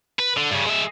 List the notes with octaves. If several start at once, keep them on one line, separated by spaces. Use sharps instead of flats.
B4
D3
G2 C#3
G#3 E5